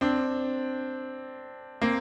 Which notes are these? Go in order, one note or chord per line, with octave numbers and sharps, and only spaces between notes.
C4 D4
A#3 C4